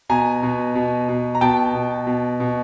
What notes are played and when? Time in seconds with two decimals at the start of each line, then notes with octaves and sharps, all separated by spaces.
0.09 B2 G#5 A#5
0.43 B2
0.75 B2
1.09 B2
1.35 A#5
1.41 B2 G5 A5
1.74 B2
2.07 B2
2.40 B2